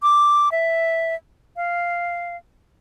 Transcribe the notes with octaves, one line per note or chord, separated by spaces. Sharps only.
D6
E5
F5